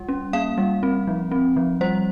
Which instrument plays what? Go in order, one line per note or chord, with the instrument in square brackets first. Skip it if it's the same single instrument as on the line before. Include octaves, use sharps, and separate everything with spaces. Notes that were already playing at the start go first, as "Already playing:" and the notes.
Already playing: [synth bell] G3
C#4
A#3 F5
G3
C4
F3
C4
F3
G3 C5